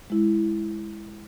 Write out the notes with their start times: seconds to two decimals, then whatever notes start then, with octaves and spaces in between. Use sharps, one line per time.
0.10 G#3 E4